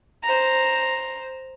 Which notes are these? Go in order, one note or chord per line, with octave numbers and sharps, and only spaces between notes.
C5 A#5